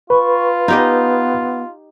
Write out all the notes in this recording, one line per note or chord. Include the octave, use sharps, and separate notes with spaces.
F4 B4 C#6
B3 D#4 G4 D#5